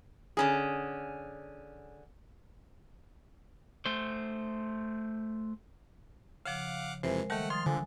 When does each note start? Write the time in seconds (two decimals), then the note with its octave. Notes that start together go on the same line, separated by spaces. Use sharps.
0.37 D3 C#4 G#4
3.85 A3 C5
6.45 C#3 F3 F5 F#5 D6
7.03 F2 C3 E3 G#3 A#4 C5
7.30 D#3 G3 A3 F#5 A5
7.50 F3 C6 D#6 F6 A6
7.66 D3 F3 G#5